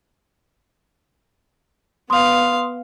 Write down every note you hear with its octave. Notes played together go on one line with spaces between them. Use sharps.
B3 F5 C6 D#6